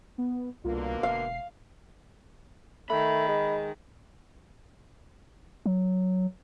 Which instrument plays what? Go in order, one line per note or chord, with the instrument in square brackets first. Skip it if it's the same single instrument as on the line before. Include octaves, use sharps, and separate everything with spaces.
[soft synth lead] B3
[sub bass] C2 [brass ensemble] B2 D3 A#3 [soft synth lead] F4
[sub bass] E1 [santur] F5 [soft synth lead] C7
[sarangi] D#3 [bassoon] A3 [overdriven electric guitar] B5
[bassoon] G#3
[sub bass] F#3